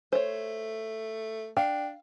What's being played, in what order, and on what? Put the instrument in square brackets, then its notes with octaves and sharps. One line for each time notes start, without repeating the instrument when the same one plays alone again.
[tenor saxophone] A3 [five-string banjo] C5 C#5
[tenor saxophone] D4 [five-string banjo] F5 [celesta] G5